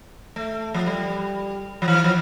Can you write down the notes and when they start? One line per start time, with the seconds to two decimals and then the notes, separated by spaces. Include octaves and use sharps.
0.36 A3
0.74 F3
0.87 G3
1.82 F3
1.88 E3
2.04 F3